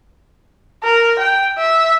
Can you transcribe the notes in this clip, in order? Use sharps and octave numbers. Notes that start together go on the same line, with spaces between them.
A#4
G5
E5